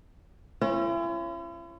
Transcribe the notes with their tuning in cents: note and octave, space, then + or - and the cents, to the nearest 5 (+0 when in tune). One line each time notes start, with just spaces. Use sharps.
C#4 -30 E4 +45